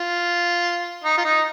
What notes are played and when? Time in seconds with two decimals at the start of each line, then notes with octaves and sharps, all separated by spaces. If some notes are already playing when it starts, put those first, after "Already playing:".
Already playing: F4
1.04 D#4
1.18 F4
1.25 D#4